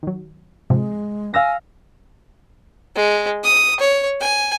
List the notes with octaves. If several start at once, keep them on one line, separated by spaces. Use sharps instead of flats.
D#3 F#3
G#2 C3 F3 G#3
F5 G#5 E6 A#6
G#3
D#6
C#5
G#5